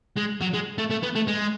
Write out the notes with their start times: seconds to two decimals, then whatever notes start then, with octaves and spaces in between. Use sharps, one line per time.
0.16 G#3
0.41 F#3
0.53 G#3
0.78 A3
0.91 A3
1.03 B3
1.16 A3
1.28 G#3